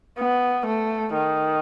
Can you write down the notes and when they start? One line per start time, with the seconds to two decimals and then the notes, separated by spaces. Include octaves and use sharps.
0.19 B3
0.66 A3
1.13 D#3